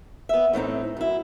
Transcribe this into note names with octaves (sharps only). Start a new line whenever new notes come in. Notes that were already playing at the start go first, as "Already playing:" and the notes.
B3 E5
A2 E3 C4 D#4
F#2 E4